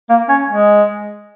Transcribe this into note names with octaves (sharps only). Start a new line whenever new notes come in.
A#3
C#4
G#3